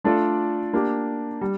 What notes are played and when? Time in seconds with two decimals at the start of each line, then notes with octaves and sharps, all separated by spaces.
0.04 A3 D4 F4 A4 D5
0.73 A#3 D4 G4
1.41 G3